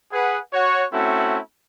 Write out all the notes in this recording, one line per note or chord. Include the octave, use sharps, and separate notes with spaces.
G#4 B4 F#5
F#4 C#5
A3 C4 C#4 E4 F#4 A4